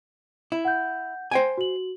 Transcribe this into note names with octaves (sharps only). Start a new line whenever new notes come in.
E4
F#5 G6
C5 G5 G#5
F#4 F#7